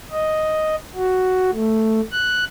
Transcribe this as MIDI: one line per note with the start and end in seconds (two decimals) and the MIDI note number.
0.12 0.76 75
0.95 1.50 66
1.52 2.01 57
2.12 2.44 90